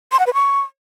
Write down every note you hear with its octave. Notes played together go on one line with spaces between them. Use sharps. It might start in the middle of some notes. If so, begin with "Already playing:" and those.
C6
F#5
B4
C#6